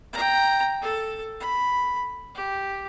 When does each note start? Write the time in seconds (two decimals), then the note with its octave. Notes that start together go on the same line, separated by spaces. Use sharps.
0.13 G5 A#5
0.82 A4
1.40 B5
2.35 G4